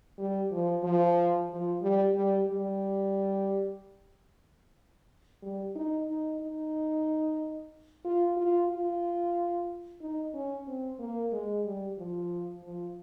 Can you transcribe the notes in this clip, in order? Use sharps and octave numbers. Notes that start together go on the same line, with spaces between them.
G3
F3
F3
F3
G3
G3
G3
G3
D#4
D#4
D#4
F4
F4
F4
D#4
C#4
C4
A#3
G#3
G3
F3
F3